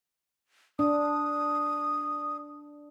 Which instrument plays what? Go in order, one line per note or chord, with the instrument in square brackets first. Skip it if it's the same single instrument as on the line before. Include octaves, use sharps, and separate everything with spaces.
[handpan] D4 [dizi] D#6